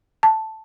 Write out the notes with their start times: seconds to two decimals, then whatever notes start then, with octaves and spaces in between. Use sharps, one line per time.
0.23 A5